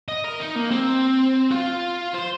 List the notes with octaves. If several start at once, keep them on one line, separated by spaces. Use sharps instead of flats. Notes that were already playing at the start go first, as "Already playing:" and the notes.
D#5
A#4
D#4
A#3
C4
F4
C5